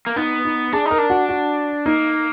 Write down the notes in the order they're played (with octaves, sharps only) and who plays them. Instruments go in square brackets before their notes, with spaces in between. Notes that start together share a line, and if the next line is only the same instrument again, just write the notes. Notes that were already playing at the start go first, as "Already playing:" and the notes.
[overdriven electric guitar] A#3
[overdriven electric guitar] B3 [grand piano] D#4
[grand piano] D#4
[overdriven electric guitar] D4 [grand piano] G#4
[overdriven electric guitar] D#4
[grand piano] A#4
[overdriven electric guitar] D4
[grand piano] F#4
F#4
[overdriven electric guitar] A#3 [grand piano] D#4